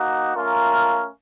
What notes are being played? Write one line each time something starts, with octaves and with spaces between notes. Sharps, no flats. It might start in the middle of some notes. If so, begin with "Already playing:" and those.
Already playing: A#3 D#4 F#4
A3 C#4 F4 A#4 F5